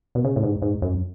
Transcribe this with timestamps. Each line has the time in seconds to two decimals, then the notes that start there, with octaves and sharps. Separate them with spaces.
0.15 B2
0.25 C#3
0.36 A2
0.43 G#2
0.62 G#2
0.82 F#2